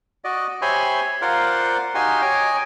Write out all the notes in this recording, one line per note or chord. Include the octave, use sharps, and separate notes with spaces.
F#4 D5 D#5
G4 C5 C#5 E5 G#5 B5
F4 A#4 C5 D5 F5 F#5
D#4 F#4 G4 F5 G#5 C6
C#5 D#5 G#5 D6